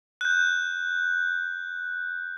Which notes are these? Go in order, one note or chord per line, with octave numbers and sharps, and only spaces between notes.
F#6 G6